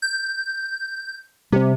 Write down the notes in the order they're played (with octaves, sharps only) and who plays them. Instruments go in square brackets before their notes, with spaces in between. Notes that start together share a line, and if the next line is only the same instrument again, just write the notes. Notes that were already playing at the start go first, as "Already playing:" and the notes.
[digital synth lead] G6
[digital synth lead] C3 [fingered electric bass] G3 B3 C4